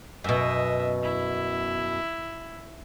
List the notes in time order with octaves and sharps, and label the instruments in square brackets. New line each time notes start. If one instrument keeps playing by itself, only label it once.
[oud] F#2 B2 [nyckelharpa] D#5 E5
[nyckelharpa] E4